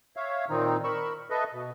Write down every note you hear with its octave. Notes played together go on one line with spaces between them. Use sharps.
C#5 E5 F5
A#2 D#3 C4 D#4
A#4 B5 C#6 E6
A4 B4 D#5 E5
B2